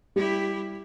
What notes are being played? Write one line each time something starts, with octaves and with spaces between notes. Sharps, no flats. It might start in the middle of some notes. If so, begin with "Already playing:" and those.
G3 E4 G4